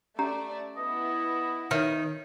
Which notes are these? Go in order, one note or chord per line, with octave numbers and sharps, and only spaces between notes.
A3 C#4 G4 D5 A#5
B3 E4 D#5
D#3 B4 C#5 E5